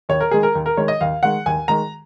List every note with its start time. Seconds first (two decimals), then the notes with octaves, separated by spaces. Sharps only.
0.09 D#2 C#5
0.21 A#4
0.31 D#3 G#3 G#4
0.43 A#4
0.55 D#2
0.66 A#4
0.77 D#3 G#3 C#5
0.88 D#5
1.01 D#2 F5
1.23 D#3 G#3 F#5
1.46 D#2 G#5
1.68 D#3 G#3 A#5